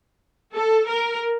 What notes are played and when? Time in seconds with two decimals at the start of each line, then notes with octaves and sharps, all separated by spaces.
0.54 A4
0.88 A#4